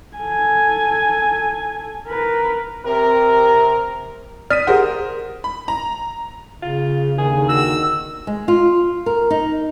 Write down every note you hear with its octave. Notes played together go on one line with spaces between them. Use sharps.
A4 G#5
A#4 B4
C3 A#4
D5 D#6 F6 B6 D#7
G4 G#4 A#4 C5 F#5
B5
A#5
C#3 F4
D#2 D3 D#3 G#4
F#4 E6
G#3
F4
A#4
D#4